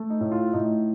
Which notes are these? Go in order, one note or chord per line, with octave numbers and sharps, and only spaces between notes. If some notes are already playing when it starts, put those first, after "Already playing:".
Already playing: A3
D#4
A2
F4
A2 D#4